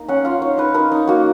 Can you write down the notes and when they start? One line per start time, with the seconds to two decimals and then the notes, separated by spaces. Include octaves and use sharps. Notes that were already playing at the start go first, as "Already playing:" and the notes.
Already playing: A#3 D#4
0.08 C#4 F#5
0.25 F4 F5
0.42 D#4 C#5
0.58 D#4 B4
0.74 D#4 A#4
0.91 D#4
1.07 A#3 F#4